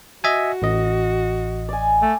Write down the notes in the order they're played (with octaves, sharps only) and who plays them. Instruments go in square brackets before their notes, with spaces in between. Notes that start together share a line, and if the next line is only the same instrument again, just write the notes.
[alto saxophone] F#4 [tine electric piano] D#5 E5 G#5
[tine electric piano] A1 D#5
[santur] D5 G#5
[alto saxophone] A3